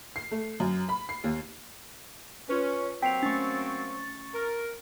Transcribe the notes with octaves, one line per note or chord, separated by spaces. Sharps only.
C7
A3
F#2
B5
C7
D#2
C#4 F4 B4
F#3 A#3 C4 G5 B6 C7 F7
A3 C#4 C#6 A6
A#4